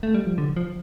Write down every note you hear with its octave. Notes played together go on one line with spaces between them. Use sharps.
A3
G3
F3
D3
F3